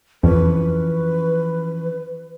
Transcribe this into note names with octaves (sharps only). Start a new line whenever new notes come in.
F2 E3 F3 C#4 B4